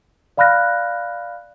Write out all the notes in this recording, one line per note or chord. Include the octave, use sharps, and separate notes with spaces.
D5 F5 B5 F6 F#6 A#6